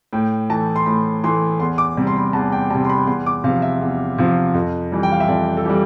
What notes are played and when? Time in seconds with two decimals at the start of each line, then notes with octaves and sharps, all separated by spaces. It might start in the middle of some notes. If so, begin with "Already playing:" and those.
0.13 A2 G5
0.50 E3 A3 A5
0.76 C6
0.86 A2 B5
1.24 E3 A3 C6
1.60 E2 C6
1.78 D6
1.97 C3 G3
2.07 C6
2.16 B5
2.33 E2 A5
2.52 G5
2.70 G3 A5
2.75 C3
2.84 C6
2.89 B5
3.07 E2 C6
3.26 D6
3.44 C3 F5
3.47 F3
3.62 E5
3.81 E2
4.18 C3 F3
4.54 F2
4.92 E3 G3
5.03 G5
5.12 F5
5.20 E5
5.28 F2 D5
5.57 A4
5.65 E3 G3 G4